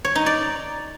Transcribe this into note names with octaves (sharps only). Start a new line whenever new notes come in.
C#5
D#4
D5